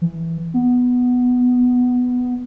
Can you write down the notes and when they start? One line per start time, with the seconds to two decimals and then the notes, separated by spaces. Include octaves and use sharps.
0.01 E3
0.54 B3